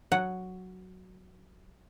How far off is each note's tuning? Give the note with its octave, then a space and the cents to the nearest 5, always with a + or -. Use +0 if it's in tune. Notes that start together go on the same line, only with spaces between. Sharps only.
F#3 +0 F#5 +0